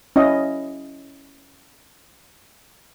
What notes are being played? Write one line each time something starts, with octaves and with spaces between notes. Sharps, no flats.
C#4 E4 D#5